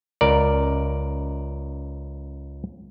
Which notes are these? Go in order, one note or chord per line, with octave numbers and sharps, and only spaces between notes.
C#2 A#4 D5